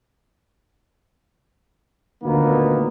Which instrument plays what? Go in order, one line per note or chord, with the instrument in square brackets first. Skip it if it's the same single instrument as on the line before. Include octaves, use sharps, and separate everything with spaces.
[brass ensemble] D2 A#2 D#3 F3 A#3 B3